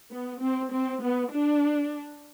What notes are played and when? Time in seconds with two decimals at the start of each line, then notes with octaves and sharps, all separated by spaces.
0.11 B3
0.40 C4
0.71 C4
1.02 B3
1.31 D4